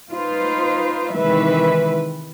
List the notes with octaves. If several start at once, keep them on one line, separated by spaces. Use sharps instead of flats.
D#4 F4 B4 C5
C3 D#3 E3 G#3 B4 E5